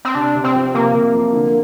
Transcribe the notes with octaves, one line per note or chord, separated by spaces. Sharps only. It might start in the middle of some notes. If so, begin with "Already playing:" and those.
C4
C3 D4
C3
C4
F3
C3 A#3
C3
F3
D3